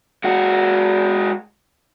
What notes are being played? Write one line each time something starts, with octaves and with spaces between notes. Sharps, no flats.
G#3 F#4